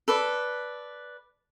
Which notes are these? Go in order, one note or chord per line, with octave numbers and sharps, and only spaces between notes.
A4 B4 D5